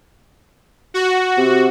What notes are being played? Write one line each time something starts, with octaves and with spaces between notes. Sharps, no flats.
F#4
C3